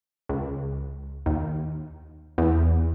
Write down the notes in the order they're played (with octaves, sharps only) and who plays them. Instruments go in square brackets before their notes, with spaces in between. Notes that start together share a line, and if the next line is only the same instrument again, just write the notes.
[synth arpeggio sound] C#2
D#2
E2